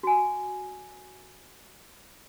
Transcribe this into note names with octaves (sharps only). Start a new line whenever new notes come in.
F#4 G#5